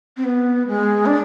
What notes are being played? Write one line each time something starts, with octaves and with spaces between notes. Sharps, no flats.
C4
B3
G#3
D4